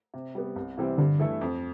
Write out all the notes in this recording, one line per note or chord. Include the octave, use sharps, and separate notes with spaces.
C3
G3 B3
C2
C3 E3 G3 C4
G2 D3
E3 A3 E4 A4
F2